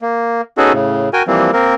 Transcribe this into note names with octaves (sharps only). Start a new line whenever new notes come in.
A#3
B3 C#4 D#4 F#4 G#4 A4
A2 C#3
F#4 A#4 G5 G#5
E3 F3 G3 A#3 C4
A#3 C4 A#4